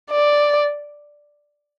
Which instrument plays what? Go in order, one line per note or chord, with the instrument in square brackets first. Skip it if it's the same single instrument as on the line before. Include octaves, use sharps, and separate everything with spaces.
[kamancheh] D5